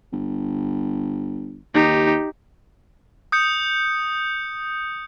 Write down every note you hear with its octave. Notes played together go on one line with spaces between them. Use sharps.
G1
D#2 D#4 G4
D#6 G6 C#7